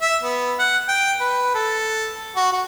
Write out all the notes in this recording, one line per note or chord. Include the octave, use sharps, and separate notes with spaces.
E5
B3
F#5
G5
B4
A4
F#4
F#4